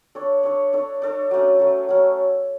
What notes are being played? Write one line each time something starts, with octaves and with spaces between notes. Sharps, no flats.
D4 A4 C#5
D4 A4 C#5
D4 A4 C#5
D4 A4 C#5
F#3 A3 C#4
F#3 A3 C#4
F#3 A3 C#4